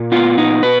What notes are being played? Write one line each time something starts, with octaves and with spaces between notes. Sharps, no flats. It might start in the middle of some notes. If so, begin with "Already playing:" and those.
Already playing: A#2
B3 F4
A#2 D#4
B2 B4